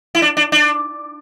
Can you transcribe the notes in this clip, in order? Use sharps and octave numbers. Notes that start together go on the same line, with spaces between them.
E4
D4
D4
D4